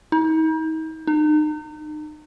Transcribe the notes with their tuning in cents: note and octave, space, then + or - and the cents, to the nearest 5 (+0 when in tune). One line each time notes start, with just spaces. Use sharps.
D#4 +40
D#4 -35